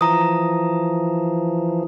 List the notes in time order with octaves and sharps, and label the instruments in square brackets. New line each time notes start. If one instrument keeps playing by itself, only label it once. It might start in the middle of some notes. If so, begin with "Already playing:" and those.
[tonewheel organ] E3 F3 [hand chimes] A#5 D#6